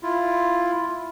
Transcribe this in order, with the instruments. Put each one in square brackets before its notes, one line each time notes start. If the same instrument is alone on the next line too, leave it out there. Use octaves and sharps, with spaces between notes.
[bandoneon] E4 F4